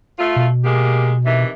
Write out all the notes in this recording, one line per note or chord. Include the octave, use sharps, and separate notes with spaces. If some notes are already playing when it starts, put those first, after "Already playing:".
A3 F4
B2
G#3 A#3 G4
C3 D#3 E3